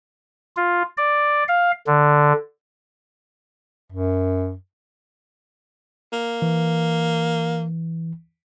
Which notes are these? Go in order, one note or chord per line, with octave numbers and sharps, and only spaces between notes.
F4
D5
F5
D3
F#2
A#3
E3